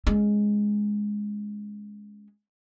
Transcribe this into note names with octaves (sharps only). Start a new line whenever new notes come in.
G#3 C#4